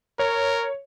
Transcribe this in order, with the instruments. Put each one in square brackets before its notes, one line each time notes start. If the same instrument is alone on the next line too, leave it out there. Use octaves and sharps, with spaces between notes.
[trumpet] A#4 [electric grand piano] C#5